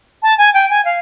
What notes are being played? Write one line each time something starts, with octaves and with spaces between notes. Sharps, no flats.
A5
G#5
G5
G#5
F5